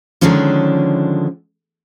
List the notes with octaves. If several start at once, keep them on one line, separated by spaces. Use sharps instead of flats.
D3 D#3 F3 G#3 C#4 D4